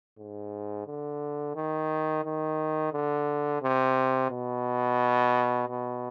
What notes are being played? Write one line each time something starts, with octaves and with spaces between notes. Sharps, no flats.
G#2
D3
D#3
D#3
D3
C3
B2
B2